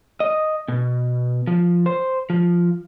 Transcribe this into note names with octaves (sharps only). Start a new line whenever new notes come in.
D#5
B2
F3
C5
F3